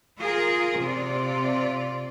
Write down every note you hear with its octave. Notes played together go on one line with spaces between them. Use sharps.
F4 G#4 A#4
C3 F4 D5